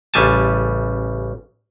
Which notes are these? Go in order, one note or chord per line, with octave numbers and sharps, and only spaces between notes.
A1 C#3 G3 G#5 A5